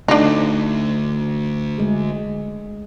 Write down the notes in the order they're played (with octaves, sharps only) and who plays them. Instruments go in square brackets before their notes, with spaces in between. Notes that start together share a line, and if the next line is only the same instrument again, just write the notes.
[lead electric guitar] D2 [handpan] A3 [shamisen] D4 D#4
[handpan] G#3 G#4